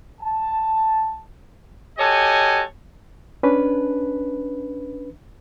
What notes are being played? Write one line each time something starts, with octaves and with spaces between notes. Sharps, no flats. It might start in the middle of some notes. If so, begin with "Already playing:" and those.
A5
F#4 G4 A4 C#5 D#5 G#5
C#4 D4 B4